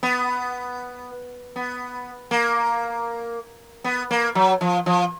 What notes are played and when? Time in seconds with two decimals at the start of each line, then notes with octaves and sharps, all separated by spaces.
0.03 B3
1.56 B3
2.31 A#3
3.84 B3
4.11 A#3
4.35 F#3
4.61 F3
4.86 F3